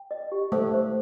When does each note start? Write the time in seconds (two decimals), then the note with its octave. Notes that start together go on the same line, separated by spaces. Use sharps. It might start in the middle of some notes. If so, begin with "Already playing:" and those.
Already playing: G5
0.11 D#5
0.32 G4
0.52 A3 C5
0.74 C5